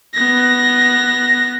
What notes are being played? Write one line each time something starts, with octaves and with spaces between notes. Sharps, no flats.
B3 A#6